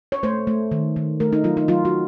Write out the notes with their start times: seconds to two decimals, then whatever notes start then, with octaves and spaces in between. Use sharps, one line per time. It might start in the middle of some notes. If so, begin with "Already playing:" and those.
0.12 C#5
0.23 A3 C5
0.47 A3
0.71 D#3
0.96 D#3
1.20 A3 A#4
1.33 D#4
1.44 F#3 F4
1.57 D#4
1.68 F#3 F4
1.85 F#4